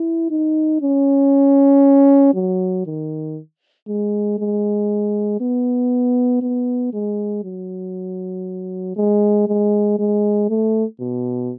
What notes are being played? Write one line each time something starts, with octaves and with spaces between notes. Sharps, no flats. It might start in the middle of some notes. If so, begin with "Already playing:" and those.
Already playing: E4
D#4
C#4
F#3
D#3
G#3
G#3
B3
B3
G#3
F#3
G#3
G#3
G#3
A3
B2